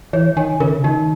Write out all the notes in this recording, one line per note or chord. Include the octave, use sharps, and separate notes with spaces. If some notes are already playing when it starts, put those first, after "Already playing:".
E3 C#5
D#3 G#5
C#3 A#4
D#3 D#4